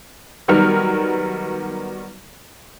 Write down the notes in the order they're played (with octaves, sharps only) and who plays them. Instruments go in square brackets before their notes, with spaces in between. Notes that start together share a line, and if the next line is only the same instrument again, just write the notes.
[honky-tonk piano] D#3 F#3 G3 B3 A#4 F6